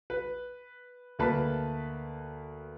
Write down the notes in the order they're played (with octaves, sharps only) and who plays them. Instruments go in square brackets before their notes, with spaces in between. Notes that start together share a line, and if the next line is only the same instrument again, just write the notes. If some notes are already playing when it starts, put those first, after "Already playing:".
[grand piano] B4
D2 A#3 B4 A5 B5